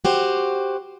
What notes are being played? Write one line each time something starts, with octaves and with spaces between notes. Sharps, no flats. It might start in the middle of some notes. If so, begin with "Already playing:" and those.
F#4 G4 C5